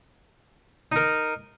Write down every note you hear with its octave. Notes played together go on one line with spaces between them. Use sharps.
D#4 A#4